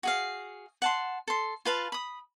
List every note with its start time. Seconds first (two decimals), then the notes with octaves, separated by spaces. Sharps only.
0.03 F#4 G#4 F5
0.82 F#5 A5 C6
1.28 A4 C6
1.65 F4 B4 F5 A5
1.92 B5 D#6